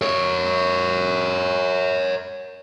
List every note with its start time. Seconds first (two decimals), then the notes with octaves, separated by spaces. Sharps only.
0.01 A#4 C#5